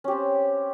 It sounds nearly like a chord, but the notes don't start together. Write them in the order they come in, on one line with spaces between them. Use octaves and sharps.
C#4 G4 C4